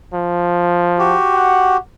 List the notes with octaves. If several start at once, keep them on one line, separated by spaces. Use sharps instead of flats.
F3
F#4 G4
F#5